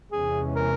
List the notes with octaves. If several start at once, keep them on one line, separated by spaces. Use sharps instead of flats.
E2 C3 E3 G#3 C#4 G#4
A#4